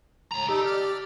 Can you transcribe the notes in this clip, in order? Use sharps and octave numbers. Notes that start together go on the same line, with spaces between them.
C#2 A2 A#5
G3 D#4 G4 A4
D5 F6